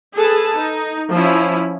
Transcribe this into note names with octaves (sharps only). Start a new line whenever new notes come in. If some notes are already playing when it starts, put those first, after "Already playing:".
G#4 A4 B4 A5
D#4
F3 C#4 E4